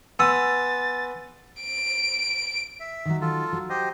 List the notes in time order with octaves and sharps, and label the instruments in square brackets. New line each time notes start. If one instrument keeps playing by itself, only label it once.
[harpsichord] B3 D#6 [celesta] G#5 C6 [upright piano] E6 [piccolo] A6
[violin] D7
[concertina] E5
[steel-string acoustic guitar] D#3 F#3
[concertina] F4 A4
[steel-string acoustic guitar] F#3
[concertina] G4 C5 D#5